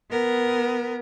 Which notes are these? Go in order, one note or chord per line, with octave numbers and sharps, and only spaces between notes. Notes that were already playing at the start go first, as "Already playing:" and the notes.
B3 A#4